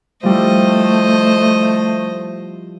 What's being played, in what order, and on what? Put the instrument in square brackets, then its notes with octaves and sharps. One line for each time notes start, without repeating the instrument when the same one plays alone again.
[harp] F3 G3 E4 [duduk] A3 [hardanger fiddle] C5 D#5